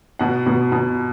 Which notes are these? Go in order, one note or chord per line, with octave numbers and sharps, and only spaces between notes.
B2 F#5
B2
B2